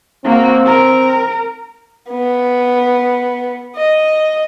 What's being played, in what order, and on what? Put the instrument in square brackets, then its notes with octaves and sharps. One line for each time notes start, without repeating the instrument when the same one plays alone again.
[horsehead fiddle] A#3 F#4 [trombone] C4
[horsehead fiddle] A#4
[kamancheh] B3
D#5